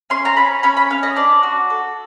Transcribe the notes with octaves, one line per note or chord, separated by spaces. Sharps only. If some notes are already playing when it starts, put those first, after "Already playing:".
C#4 C6
A#5
C#4 B5
C#4 B5
B5
C#4 F5
D#5
D4 D5
F#4
A4